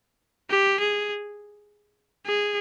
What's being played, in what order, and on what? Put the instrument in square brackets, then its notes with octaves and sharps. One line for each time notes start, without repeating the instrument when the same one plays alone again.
[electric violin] G4
G#4
G#4